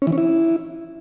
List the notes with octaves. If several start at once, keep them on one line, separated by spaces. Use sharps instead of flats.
C#4
E3
C#4
E4